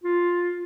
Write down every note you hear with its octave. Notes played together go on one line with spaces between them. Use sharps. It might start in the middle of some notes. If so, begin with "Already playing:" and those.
F4